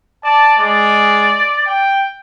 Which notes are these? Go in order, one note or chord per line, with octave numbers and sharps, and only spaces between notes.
D5 A5
G#3 D5
G5